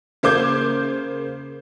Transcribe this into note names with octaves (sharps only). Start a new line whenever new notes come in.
C#3 A#3 C5 D6 G6 G#6